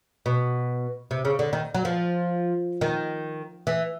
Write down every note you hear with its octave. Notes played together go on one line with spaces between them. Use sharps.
B2
C3
C#3
D3
D#3
F#3
F3
D#3
E3